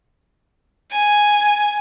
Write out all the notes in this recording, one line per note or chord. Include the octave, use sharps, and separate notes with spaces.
G#5